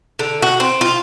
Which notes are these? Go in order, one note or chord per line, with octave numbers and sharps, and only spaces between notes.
D3
F#4
C4
F4